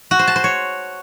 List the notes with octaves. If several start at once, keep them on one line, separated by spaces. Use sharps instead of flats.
F#4
C5
A5
C5
C#5